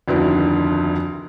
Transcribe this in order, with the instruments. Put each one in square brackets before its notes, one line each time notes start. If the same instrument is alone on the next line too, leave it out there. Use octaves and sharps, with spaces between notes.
[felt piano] F1 D2 D3 D#3 B3 E4